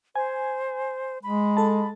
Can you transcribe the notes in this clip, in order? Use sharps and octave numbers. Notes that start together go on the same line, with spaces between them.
C5 G#5
G#3 B5
A4 A5